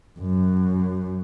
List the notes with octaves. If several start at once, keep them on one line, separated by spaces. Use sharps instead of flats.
F#2